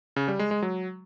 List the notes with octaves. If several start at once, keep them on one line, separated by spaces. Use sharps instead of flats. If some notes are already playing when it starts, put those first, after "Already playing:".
C#3
G3
G#3
G#3
F#3